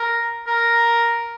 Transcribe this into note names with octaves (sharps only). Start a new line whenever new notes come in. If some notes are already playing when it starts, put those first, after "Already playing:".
Already playing: A#4
A#4